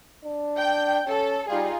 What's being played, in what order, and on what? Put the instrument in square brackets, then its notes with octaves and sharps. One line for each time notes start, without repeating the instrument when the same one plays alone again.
[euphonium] D4
[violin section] G5 G6
[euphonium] C#4 [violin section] A4
[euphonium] G3 [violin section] D#4 F4 G#4